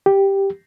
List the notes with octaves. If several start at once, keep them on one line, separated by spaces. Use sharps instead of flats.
G4